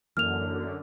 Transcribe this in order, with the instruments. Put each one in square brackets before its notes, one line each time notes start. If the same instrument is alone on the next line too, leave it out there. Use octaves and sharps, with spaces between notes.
[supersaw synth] F#2 D3 [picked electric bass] E3 A#3 [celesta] F6 F7